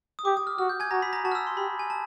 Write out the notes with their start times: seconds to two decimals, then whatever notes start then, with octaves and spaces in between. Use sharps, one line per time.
0.19 D#6
0.25 G4 D6
0.37 D#6
0.47 F6
0.58 F#4 F6
0.69 G6
0.80 G#5 G#6
0.91 F#4 A#5 A#6
1.02 B5 B6
1.13 A#5 A#6
1.24 F#4 A5 A6
1.32 F6
1.35 E6
1.47 C6
1.57 G4 B5
1.79 G#5
1.90 A5